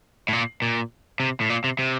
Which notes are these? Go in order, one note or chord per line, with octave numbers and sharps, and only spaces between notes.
A2
A#2
A#2
C3
A2
A#2
C3
C3